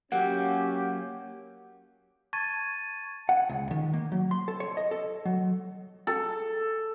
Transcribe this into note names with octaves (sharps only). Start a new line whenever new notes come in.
F#3 A#3 C#4 G4 F#5
A5 C#6 G#6 A6 D#7
F#5
C#2
D#3
A#3
F#3
C6
A4
C#5
D#5
A4
F#3
A4